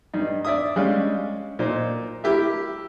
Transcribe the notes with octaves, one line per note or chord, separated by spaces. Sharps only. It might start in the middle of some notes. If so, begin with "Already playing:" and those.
G2 D#4
D5 E5 D#6
G3 G#3 C#4 F5
A#2 D#4 C5
E4 G4 A#4 E5